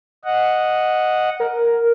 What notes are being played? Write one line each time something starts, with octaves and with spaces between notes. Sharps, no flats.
D#5 F#5
A#4